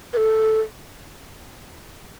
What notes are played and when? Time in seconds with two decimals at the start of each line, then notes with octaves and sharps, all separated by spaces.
0.13 B4
0.17 A4